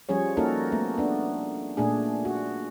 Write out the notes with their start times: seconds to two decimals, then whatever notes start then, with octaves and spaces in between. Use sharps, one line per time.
0.09 F3 G3 C#4 G#4 C#5
0.37 A#3 C#4 D#4 F#4 A4 A#4
0.72 A3 B3
0.98 B3 D4
1.77 A#2 A3 D4 G#4
2.25 F#4